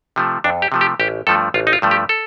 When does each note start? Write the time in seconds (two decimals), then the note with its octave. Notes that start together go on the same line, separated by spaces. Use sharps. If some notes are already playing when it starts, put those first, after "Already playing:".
0.16 C3 F3 A3
0.44 F2 D4
0.62 G4
0.72 C3 F3 A3
0.81 G4
1.00 A1 G4
1.27 G2 F3 A3 A4
1.54 A1 F4
1.67 D#4
1.73 F4
1.82 G2 F3 A3
1.91 G4
2.09 A4